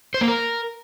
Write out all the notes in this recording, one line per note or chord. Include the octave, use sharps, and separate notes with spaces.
C5
A#3
A#4